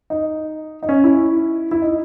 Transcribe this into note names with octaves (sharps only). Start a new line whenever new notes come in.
D#4
D#4
C#4
E4
E4
D#4